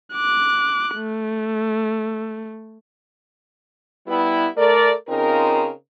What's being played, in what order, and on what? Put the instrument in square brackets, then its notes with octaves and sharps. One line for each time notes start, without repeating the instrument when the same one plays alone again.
[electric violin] D6 F#6
A3
[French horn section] G3 B3 E4
A3 A#4 D5
C#3 C4 D#4 F4 A#4